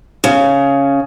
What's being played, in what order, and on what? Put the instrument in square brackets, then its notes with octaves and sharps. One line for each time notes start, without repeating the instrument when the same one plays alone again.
[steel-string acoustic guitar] C#3